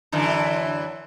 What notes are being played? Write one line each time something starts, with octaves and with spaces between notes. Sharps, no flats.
F#2 D3 E3